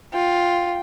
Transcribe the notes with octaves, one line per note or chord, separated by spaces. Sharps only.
F4 G5